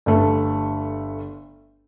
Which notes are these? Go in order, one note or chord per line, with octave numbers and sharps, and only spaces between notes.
G1 A3